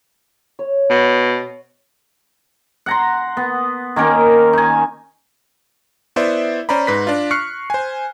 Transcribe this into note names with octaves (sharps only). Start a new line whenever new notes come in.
C#5
B2
F#5 A#5 C6
B3
D#3 A#3 C#4 A#4
D#4 G#5
B3 E4 C5 D5 E5
C#4 C5 D5 A#5 B5
G#2 B4 A#6 B6
D4 F4
C#6 F6 F#6 C7 C#7
C5 G#5